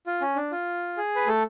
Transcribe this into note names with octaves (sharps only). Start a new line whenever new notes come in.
F4
C#4
D4
F4
G#4
B4
A3 A4